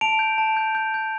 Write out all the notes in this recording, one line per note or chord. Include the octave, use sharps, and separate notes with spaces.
A5 D7 F7
G6
A5
G6
G6
G6